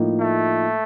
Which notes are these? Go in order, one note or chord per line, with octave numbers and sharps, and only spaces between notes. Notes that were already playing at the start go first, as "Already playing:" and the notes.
Already playing: A2 F3 A#3 D#4
A3